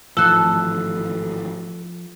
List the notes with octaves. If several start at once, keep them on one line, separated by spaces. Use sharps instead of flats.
G#1 A2 E3 F3 A4 E6 F#6